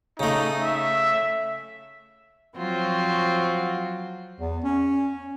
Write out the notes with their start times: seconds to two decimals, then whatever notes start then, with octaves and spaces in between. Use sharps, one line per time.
0.20 C#3 A3 D#4
0.63 E5
2.57 F3 F#3 C4 F4 F#4
4.40 E2
4.64 C#4